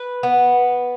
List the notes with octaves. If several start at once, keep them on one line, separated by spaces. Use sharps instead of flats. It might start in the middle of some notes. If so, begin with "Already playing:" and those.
Already playing: B4
B3